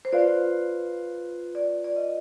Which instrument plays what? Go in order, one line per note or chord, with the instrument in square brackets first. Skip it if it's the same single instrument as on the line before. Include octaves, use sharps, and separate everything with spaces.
[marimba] C5
[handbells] F4 B4 F5 [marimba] D5
[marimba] D5
D5
D#5